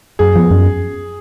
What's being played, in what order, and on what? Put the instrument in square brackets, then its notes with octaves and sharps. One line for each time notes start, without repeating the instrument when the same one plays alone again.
[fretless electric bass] F#2 [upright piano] G#4
[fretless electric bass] F3 B3
F#2